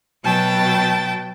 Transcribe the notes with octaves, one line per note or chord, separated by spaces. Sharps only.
B2 F#3 G5 A5 A6